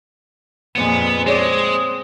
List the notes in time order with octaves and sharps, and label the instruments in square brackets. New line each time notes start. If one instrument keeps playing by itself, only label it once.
[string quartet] F2 A#2 G#3 [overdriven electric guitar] B3
[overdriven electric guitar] G#3 [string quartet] C4 [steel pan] G#4 C#5 D5